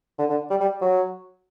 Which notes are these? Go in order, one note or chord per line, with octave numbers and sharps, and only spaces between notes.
D3
D3
G3
G3
F#3